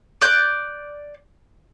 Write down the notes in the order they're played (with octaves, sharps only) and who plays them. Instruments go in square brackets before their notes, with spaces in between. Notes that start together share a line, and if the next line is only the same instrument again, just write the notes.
[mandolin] D5 F#6 G6